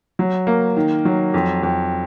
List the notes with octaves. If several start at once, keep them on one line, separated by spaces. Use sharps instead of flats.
F#3
A#3
D#3
F#3
F2
F2